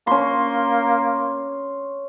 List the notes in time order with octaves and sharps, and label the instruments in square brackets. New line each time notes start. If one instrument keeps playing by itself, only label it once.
[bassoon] A#3 [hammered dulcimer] C#4 C6